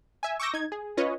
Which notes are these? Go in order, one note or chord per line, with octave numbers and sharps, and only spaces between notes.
E5 G#5
C#6 D6 E6 G6 A#6
D#4 G#6
G#4
C#4 F4 B4 C#5 D#5